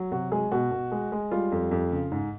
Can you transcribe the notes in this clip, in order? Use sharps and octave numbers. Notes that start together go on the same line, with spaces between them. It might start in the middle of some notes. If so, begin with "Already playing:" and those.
Already playing: F#3
C3 F#4
G#3 G#4
B2 F#4
B2
G#3
G#3
G3 F4
F2
F2
C#3
G#2